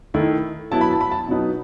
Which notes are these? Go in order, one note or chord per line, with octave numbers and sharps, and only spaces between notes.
D#3 A3 E4
F#3 B3 E4 A5
B5
A5
B5
A5
B2 F#3 B3 D#4